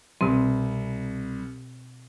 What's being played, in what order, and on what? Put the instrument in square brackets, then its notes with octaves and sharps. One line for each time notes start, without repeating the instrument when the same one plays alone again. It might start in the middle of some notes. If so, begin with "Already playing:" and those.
[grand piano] C2 [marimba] B2 C4